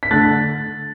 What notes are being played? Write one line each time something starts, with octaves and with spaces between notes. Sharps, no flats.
B6
D3 A3 F#6 A6